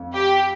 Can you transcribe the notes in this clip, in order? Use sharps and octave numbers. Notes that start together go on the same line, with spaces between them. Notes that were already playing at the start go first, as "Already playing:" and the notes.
Already playing: F2
G4